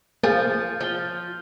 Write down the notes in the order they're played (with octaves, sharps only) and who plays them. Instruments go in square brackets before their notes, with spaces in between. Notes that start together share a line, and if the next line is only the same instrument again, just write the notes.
[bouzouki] F3 [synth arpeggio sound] A#3 G#4 F5 [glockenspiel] F6 G6 A6
[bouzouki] F3 [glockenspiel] F6 G7